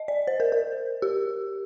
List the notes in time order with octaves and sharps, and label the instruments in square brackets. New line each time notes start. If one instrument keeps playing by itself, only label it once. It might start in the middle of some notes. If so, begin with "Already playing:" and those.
Already playing: [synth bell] D#5
D5
C5
A#4
A#4
G4